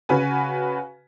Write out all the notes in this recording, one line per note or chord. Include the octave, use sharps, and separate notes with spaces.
C#3 F#4 B4 G#5